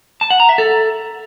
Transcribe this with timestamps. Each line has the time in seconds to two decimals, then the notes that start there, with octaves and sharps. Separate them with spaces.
0.21 A5
0.30 F#5
0.40 A#5
0.49 E5
0.58 A4